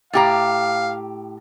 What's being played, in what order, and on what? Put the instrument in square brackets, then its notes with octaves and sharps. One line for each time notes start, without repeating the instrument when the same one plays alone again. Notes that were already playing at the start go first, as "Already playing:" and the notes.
[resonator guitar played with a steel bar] A2 G4 A#5 [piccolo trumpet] F5